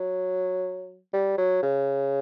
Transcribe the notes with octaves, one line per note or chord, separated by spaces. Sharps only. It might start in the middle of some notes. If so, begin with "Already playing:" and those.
Already playing: F#3
G3
F#3
C#3